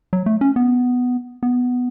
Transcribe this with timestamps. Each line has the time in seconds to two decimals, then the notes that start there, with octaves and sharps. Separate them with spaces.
0.13 F#3
0.26 A3
0.41 C#4
0.56 B3
1.43 B3